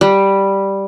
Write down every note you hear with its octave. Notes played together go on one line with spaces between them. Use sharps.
G3